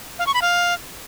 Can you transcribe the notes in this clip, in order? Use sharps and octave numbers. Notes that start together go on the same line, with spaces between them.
F5
C#6
B5
F5